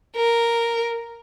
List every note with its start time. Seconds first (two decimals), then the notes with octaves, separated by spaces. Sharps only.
0.16 A#4